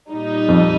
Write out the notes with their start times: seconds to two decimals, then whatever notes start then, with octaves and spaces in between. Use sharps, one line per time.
0.11 A#2 G3 D#4
0.48 F2